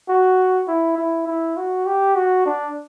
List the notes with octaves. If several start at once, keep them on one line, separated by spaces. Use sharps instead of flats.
F#4
E4
E4
E4
F#4
G4
F#4
D4